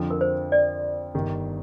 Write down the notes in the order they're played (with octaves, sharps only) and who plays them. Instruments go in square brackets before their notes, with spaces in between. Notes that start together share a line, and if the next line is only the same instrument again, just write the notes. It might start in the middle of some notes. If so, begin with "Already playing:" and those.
Already playing: [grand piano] F2 D3 F3
[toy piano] A#4
C5
D5
[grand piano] G1 G2 D#3